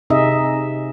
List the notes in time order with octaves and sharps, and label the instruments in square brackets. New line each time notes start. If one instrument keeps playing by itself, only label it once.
[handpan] C3 D#4 G#4 D#5 E5